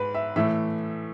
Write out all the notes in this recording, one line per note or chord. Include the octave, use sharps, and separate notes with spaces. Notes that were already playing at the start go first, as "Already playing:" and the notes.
Already playing: G#2 G#3 B4
E5
A2 E3 A3 E5